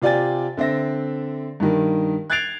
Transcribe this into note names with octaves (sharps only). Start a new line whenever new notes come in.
C3 F4 D5 G5 G#5 A6
D3 C4 E5 A#6
G2 D#3
F#6 G#6 A6 C7 D7 F7